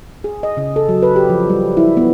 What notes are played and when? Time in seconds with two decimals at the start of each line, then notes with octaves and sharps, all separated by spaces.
0.24 G#4
0.43 D#5
0.57 C#3
0.76 A4
0.89 F#3
1.03 B4
1.16 G4
1.30 F3
1.50 G3
1.77 E4
1.97 B3